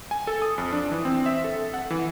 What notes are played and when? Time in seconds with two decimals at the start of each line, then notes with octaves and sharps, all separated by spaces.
0.11 G#5
0.27 A4
0.42 D#6
0.58 F2
0.72 D4
0.91 E3
1.05 C4
1.26 E5
1.44 A4
1.74 F#5
1.90 E3